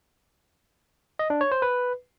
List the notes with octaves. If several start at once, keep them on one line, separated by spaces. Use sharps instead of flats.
D#5
D4
C#5
C5
B4